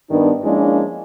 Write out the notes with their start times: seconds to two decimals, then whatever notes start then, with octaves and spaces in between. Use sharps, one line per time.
0.10 G2 D#3 B3 D4
0.44 F3 G#3 A#3 C#4 D4 E4